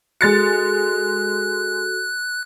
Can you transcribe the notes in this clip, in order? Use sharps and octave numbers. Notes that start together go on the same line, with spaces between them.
G#3 F#4 A4 F#6 A6 C#7